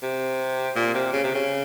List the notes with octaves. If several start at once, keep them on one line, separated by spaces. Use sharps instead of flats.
C3
A#2
C3
C#3
C3
C#3